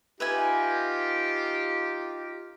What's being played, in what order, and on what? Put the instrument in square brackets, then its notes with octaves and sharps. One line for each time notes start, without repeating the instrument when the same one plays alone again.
[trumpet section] D#4 F4 G4 [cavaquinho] B4 E5 G#5